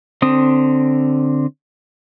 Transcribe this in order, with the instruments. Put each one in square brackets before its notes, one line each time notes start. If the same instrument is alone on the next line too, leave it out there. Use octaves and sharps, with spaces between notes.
[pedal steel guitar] D3 C4 D#6